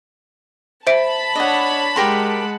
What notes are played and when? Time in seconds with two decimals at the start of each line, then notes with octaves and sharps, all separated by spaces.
0.87 C5 E5 A5 B5 D7
1.35 D4 C#5 D#5 F#5
1.96 G#3 G4 A#4 F#5 C6